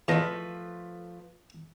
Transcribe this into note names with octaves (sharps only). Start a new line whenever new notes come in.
E2 F3 A3 B4 D#5